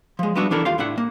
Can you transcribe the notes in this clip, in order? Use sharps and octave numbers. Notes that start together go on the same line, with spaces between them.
F3 G#3
G3 B3 D4 F#4 E5
E3 D4 E4 A4 A#4
D#2 F4 G4 F5 C6
A2 D4 E5 F#5
A#3